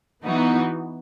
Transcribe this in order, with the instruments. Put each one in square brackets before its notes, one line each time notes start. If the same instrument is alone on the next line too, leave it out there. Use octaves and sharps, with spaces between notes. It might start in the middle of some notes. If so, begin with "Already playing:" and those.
[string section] E3 B3 D#4 F#4